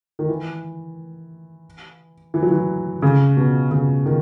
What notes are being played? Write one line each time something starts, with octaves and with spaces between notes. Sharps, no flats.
D#3
E3
E3
F#3
E3
C#3
B2
C#3
D#3